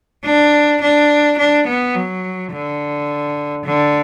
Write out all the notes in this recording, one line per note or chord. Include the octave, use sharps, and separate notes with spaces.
D4
D4
D4
B3
F#3
D3
D3